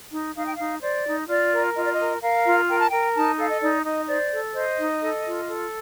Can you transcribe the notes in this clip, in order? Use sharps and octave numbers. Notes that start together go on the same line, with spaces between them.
D#4
D#4 F5
G5
D#4 F5
C5 D5
D#4
F4 D5
A#4
F4 D#5
D5
D#5
A#4
A#4 F5
F4
A#4 G5
A5
A#4 G5
D#4 A5
A4 F5
D#5
D#4 D5
D#4 D#5
C5 D5
A4
C5 D#5
D#4
A4
F4
A4